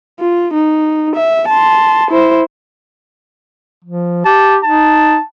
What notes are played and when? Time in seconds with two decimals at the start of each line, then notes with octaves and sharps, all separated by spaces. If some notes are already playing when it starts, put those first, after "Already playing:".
0.20 F4
0.54 D#4
1.16 E5
1.49 A5 C6
2.11 E4 C5
3.84 F3
4.25 G4 A5
4.64 D#4 A5